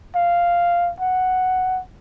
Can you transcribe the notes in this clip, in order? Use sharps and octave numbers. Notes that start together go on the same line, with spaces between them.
F5
F#5